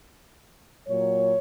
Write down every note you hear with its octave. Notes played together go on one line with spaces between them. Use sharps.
A#2 F#3 C#5